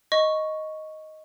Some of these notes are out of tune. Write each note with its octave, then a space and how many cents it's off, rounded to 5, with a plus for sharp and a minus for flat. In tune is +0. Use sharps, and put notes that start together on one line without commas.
D#5 +5 C#6 +0